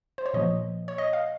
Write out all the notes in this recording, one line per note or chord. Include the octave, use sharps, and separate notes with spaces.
C5
C#5
A#2 F3 A#3 D#5
C#5
D#5
F5